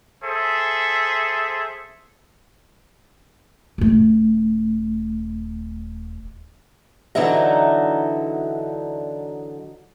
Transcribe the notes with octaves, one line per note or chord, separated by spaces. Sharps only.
G#4 A4 C5 E5
D#1 A3
D3 E3 F#3 D#4 E5 A#5